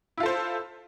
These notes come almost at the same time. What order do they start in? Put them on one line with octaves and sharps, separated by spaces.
E4 F4 A4 C5